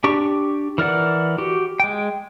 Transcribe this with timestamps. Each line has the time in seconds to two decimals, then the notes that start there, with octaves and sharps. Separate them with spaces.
0.04 D4 G4 C#6
0.78 E3 A#4 D5 F#5
1.38 F#4 G4
1.80 G#3 G5